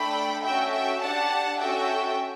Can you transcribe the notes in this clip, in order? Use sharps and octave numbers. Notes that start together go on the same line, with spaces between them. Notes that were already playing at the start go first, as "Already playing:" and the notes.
Already playing: A3 D4 A4 G5 B5
C#4 F#4 A4 E5 G5
E5 G5
D4 G4 F#5 A5
C#4 F#4 A4 E5 G5